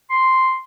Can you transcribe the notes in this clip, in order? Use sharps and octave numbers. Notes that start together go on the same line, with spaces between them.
C6